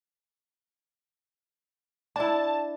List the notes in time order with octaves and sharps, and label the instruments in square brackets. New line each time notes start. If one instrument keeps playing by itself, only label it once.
[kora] D4 E4 [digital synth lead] A5